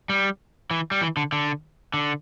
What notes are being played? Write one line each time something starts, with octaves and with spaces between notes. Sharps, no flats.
G3
E3
G3
E3
D3
D3
D3